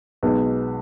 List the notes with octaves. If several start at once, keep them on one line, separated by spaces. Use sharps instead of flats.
B1 B2 G#3 B3